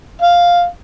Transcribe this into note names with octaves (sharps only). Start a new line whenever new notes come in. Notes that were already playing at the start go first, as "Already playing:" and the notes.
F5